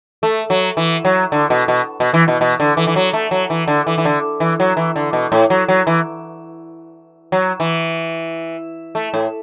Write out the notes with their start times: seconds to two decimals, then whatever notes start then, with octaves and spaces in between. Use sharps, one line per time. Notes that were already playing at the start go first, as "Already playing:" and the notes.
0.23 A3
0.50 F#3
0.77 E3
1.05 F#3
1.32 D3
1.50 B2
1.68 B2
2.00 B2
2.14 E3
2.28 B2
2.41 B2
2.60 D3
2.77 E3
2.87 E3
2.96 F#3
3.13 A3
3.31 F#3
3.50 E3
3.68 D3
3.87 E3
3.98 E3
4.05 D3
4.40 E3
4.60 F#3
4.77 E3
4.96 D3
5.13 B2
5.32 A2
5.50 F#3
5.68 F#3
5.87 E3
7.32 F#3
7.60 E3
8.95 A3
9.14 A2